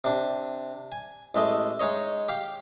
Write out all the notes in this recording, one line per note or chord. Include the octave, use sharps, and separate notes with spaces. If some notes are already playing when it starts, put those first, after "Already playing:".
C3 D4
G#5
A1 G#3 A3 D#5
G#3 D#4 C#5 D#5
G4 F5